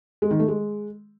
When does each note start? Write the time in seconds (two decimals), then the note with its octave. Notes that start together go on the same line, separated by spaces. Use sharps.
0.22 G#3
0.31 D#3
0.39 A3
0.48 G#3